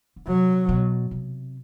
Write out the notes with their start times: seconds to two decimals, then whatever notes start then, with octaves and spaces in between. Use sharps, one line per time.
0.16 D3
0.27 C3 F#3
0.69 B2
1.11 C3